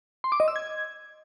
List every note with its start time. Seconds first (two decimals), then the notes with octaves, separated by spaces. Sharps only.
0.24 C6
0.32 D6
0.40 D#5
0.48 E6
0.56 G#6